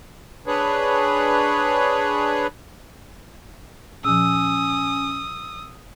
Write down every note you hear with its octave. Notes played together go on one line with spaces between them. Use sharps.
D4 G#4 B4 C#5
A#2 F3 C#4 D#6 E6